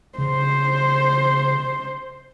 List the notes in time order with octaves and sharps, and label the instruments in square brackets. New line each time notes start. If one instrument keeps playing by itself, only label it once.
[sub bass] C#3 [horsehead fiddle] C5